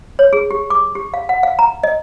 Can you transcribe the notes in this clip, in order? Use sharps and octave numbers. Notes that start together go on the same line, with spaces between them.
C#5
G#4
G4
D6
G4
F5
F#5
F5
A#5
D#5